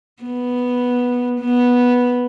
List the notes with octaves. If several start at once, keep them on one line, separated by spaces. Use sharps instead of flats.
B3
B3